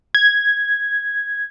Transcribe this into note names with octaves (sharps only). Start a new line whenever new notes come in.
G#6